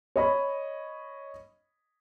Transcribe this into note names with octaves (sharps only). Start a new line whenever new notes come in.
C#5 D#5 B5